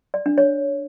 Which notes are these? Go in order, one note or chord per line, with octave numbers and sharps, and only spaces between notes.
D5
D4
C#5